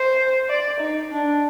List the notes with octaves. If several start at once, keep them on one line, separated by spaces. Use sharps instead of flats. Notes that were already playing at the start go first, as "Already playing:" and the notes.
Already playing: C5
D5
D#4
D4